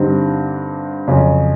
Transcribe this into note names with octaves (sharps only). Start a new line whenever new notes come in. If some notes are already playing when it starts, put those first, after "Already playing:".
Already playing: G2 D3 G3 C4 D#4
F2 C#3 F#3